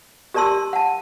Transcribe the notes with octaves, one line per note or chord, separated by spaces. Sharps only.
G4 A#4 D5 A5 C6 E6
F#5 A5